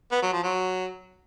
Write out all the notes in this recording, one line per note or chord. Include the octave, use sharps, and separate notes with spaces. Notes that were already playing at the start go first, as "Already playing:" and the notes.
B3
F#3
F3
F#3